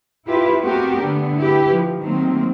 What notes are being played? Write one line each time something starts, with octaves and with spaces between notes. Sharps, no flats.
E4 F4 G4 B4 E5
A3 B3 C4 F#4 G4 A#4
D3 A3 B3 D4
E4 G4 B4
F3
D#3 F#3 A3 A#3 C4